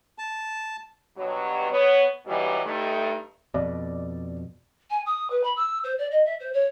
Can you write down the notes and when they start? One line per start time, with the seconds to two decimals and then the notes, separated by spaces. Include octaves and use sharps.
0.18 A5
1.17 G2 B2 F#3
1.71 B3 C#5
2.26 G#2 B2 E3 F#3 G3
2.64 G2 A3 D#4
3.54 F2 B2 D5
4.90 G#5
5.06 D#6
5.30 B4
5.43 B5
5.56 E6
5.84 C5
5.98 D5
6.11 D#5
6.25 E5
6.40 C5
6.53 C#5